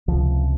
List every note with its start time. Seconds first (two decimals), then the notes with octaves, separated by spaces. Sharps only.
0.08 C#2 C3 F3